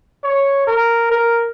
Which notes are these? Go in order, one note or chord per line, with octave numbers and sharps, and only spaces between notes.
C#5
A#4
A#4